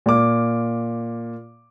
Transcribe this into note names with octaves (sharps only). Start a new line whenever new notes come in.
A#2 F5 D6